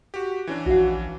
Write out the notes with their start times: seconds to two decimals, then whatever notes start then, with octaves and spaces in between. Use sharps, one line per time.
0.14 F#4 G4
0.47 E3 C#4 D4
0.66 A#1 F#4 F5